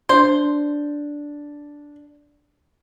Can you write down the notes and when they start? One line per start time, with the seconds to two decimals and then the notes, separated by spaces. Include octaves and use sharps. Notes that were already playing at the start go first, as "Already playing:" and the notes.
0.09 D4 C5